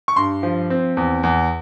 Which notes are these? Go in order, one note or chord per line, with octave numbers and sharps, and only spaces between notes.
C#6
G2 C6
F3
C4
E2
E2